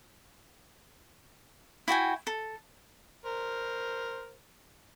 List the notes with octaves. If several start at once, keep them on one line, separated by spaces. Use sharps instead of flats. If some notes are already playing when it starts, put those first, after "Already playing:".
E4 F#4 G5 G#5
A4
A#4 C5